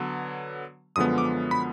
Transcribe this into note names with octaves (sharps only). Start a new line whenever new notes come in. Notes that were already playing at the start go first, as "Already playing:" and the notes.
Already playing: D3 F#3 B3
F#2 D3 F3 G#3 B3 D#6
D6
B5